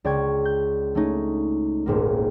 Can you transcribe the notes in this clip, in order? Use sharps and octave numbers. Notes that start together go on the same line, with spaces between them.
C#2 D5 G5 C#6 G#6
G6
A3 C#4 D#4
D#1 G#1 A#3